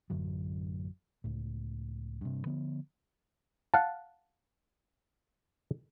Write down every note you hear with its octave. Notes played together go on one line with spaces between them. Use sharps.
A1 F#2 D3 F#3
C#2 A2
G2 C3
D3 F3 B3
F5 F#5 A5